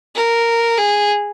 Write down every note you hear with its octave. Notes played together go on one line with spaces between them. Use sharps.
A#4
G#4